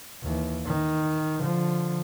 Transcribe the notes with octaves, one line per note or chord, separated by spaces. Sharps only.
D#2 E3
D#3
D3 F3